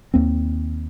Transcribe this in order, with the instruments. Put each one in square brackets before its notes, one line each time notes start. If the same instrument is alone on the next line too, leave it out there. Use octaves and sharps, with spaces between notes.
[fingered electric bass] D#2 A#3 C4